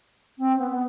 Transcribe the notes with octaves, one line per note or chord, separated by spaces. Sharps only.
C4
B3
B3